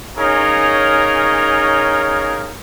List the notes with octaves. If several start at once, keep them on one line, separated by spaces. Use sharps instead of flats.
C#4 D#4 G#4 A#4 C#5 F5